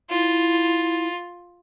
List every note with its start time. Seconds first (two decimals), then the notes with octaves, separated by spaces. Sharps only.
0.10 E4 F4